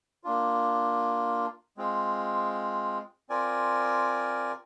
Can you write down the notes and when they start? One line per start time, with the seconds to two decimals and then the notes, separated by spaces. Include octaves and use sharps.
0.24 A#3 D4 F4
1.77 G#3 C4 F4
3.29 C4 F4 A#4 D5 G#5